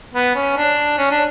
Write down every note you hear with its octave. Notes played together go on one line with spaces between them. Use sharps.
B3
C#4
D4
C#4
D4